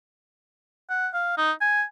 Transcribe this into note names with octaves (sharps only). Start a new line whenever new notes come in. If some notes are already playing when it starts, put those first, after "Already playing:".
F#5
F5
D#4
G#5